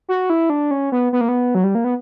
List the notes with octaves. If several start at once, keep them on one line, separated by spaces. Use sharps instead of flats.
F#4
E4
D4
C#4
B3
B3
A#3
B3
F#3
G3
A#3
B3